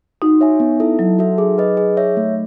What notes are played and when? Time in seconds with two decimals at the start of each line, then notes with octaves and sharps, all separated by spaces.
0.22 D#4 F#4
0.41 C#5 E5 G#5
0.60 B3
0.80 E4 A4 E5
0.99 F#3 D#4
1.19 F#4 A4 E5
1.38 G#4
1.58 B4 D#5
1.77 G#4
1.97 C#5 E5
2.17 A3